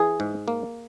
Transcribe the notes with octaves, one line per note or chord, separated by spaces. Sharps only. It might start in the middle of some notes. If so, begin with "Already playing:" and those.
Already playing: E3 G#4
G#2
A#3